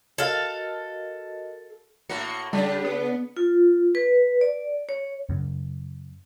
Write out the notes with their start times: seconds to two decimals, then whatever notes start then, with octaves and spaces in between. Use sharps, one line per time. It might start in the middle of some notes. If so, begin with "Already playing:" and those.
0.18 F#4 A4 A#4 D#5 F5
2.09 A2 A#3 F#4 C#7
2.53 C#3 G3 D4
2.85 B3
3.37 F4
3.95 B4
4.41 D5
4.89 C#5
5.29 F#2 C#3